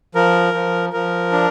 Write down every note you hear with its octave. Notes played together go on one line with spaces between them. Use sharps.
F3 A#4
F3
F3 A#4
D4